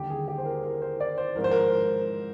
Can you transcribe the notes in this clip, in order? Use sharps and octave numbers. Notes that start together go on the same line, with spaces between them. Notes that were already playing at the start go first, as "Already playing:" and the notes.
Already playing: D#2 D3 G3 G4
G#4
G4
C5
A#4
A#4
C5
D5
C5
G#2 F3 A#4
C5
A#4